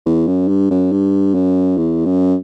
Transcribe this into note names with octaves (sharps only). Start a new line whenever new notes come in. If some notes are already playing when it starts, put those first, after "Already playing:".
E2
F#2
G2
F#2
G2
F#2
E2
F#2